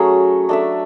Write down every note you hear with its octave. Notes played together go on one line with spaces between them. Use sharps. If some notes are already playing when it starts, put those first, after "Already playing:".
Already playing: F#3 A3 C#4 G#4
A3 D4 A4 E5